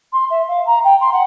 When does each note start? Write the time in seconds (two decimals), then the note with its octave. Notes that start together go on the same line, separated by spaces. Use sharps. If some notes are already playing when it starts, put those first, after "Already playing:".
0.12 C6
0.30 E5
0.48 F5
0.66 A#5
0.84 G5
1.00 C6
1.12 F#5